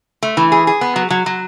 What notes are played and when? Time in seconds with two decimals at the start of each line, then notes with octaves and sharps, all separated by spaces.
0.23 A3
0.37 E3
0.52 G#4
0.67 G#4
0.81 B3
0.96 F#3
1.10 F#3
1.26 F#3